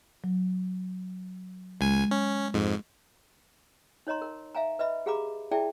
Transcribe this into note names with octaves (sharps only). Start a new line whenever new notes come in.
F#3
C#2 G#3 G#5
C#4
F2 G#2
D#4 C#5 D#5 A#5 C6
A#4
E5 F5 G#5 A#5
B4 D#5 E5 B5
G4 G#4 F5 A#5 B5 D6
E4 G#4 D5 E5 G5 A5